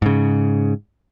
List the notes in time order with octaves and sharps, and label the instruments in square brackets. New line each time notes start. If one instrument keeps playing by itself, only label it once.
[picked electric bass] G#2 C#3